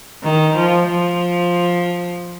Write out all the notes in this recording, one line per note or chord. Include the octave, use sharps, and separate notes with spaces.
D#3
F3
F3